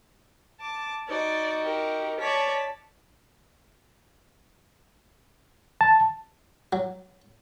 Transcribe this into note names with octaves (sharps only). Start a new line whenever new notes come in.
A5 D6
D#4 F#4 D5
G4 A#4
C#5 D5 A5 B6
A5
F#3